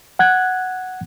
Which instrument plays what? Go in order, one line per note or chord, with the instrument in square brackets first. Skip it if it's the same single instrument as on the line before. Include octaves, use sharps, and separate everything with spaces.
[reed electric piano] F#5 F#6 G#6